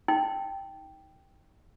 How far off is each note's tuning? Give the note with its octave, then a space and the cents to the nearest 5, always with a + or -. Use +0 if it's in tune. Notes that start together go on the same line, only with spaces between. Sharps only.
D#4 +15 G5 +0